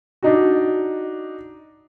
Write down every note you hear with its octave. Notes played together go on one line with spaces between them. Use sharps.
D4 D#4 F#4